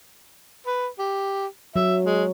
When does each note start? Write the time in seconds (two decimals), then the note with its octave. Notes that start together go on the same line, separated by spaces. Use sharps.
0.66 B4
0.99 G4
1.76 F#3 E5
2.04 G#3